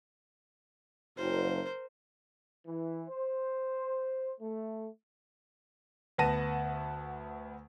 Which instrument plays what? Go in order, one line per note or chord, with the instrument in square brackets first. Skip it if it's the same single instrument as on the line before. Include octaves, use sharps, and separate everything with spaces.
[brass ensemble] F#1 [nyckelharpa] A#4 C5
[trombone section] E3
C5
A3
[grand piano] D2 B3 F#5 A5 A#6 D#7